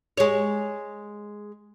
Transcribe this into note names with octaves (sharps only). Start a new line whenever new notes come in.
G#3 C#5